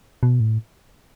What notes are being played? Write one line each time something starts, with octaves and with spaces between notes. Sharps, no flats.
B2
A2